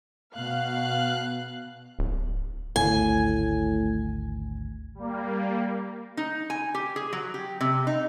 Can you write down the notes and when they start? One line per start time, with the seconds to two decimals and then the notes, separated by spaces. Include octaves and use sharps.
0.35 B2 F5 F#6
1.99 D1
2.76 G#1 D2 A2 G#5
4.95 G3 A#3
6.17 D#4
6.50 G#5
6.75 G4
6.96 G#4
7.13 F#3
7.34 G4
7.61 C3
7.87 D#4